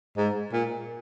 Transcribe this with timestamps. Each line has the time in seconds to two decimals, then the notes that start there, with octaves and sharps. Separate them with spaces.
0.17 G#2
0.53 A#2